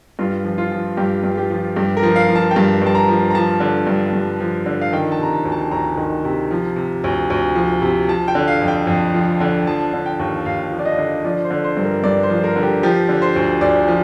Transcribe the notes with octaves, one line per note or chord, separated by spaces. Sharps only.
G2 F4
F3
F4
F3
G2 G4
G2
G4
F3
G2 G4
A#4
F3
F5
F3
A5
G5
G2 A5
G2 A5
A#5
F3
A#5
F3 A5
D3
G2
G2
F3
D3
F5
D#3 G5
A5
C3 A#5
A5
D2
A5
D2 A#5
D#3
C3
F3
C3
D2
D2
F3
C3
F3 A5
G5
D3
F5
F2
G5
F2
F3
D3
F3 A5
D3
G5
D#2
D#2 F5
F3
D5
D#5
D3
F3 D5
C5
D3
C5
G2
A#4
G2 D5
C5
F3
A#4
D3
G4
F3 G4
D3
C5
D2
D2 D5
F3